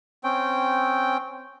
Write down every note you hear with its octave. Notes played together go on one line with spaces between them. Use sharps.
C4 C#4 G5